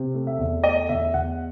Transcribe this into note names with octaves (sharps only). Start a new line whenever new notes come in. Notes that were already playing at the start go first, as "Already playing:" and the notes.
Already playing: C3
A3
E5
E2
A3 D#5
E2 E5
E2 F#5